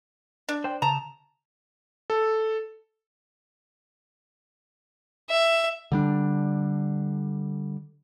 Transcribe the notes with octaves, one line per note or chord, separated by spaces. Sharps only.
D4
C5 D5 G5
C#3 A5 A#5
A4
E5
D3 G3 D4